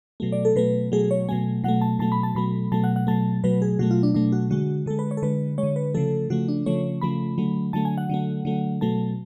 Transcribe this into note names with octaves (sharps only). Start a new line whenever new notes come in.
B2 F#3 A3
D5
A4
B2 F#3 A3 B4
B2 F#3 A3 G#4
C#5
B2 F#3 A3 G#5
B2 F#3 A3 F#5
A5
B2 F#3 A3 A5
B5
A5
B2 F#3 A3 B5
B2 F#3 A3 A5
F#5
F#5
B2 F#3 A3 A5
B2 F#3 A3 B4
G#4
B2 F#3 A3 F#4
F4
D4
B2 F#3 A3 D4
F#4
D3 G#3 F#4
D3 G#3 A4
B4
C#5
A4
D3 G#3 B4
G#3 C#5
D3
B4
C#3 F3 A3 A4
C#3 F3 A3 F#4
D4
C#3 F3 A3 C#5
C#3 F3 A3 B5
D3 F#3 A3
D3 F#3 A3 A5
G#5
F#5
D3 F#3 A3
D3 F#3 A3
B2 F#3 A3 A5